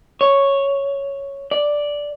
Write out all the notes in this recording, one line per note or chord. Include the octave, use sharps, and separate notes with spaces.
C#5
D5